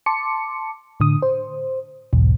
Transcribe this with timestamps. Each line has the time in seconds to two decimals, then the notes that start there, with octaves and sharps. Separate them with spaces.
0.06 A5 C6 D6 C#7
1.00 A2 D3 D#6
1.22 C5
2.13 B1 E2 G#2 B2